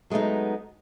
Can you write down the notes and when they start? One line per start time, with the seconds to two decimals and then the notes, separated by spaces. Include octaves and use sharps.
0.10 F#3 G#3 A3 B3 D#4